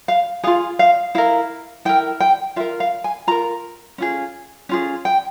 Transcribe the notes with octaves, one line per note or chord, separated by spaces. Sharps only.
F5
F4 G#4 F5
F5
E4 A#4 F5
E4 A#4 G5
G5
F4 A#4 E5
F5
G#5
F4 A#4 A#5
C#4 F4 G#4
C#4 F4 G#4
G5